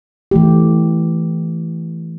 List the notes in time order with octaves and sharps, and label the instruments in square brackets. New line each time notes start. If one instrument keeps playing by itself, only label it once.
[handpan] E3 A3 G4